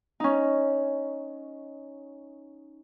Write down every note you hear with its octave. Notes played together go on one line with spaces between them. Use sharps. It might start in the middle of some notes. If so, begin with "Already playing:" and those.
C#4 D#4